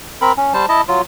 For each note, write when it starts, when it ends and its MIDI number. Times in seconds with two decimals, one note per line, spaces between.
0.22 0.32 60
0.22 0.32 70
0.22 0.32 83
0.37 0.53 61
0.54 0.66 55
0.54 0.66 72
0.54 0.66 81
0.69 0.81 64
0.69 0.81 75
0.69 0.81 81
0.88 1.01 54
0.88 1.01 65